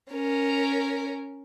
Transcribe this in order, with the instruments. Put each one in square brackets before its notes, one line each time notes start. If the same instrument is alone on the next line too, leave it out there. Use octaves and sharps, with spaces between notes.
[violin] C#4 A#4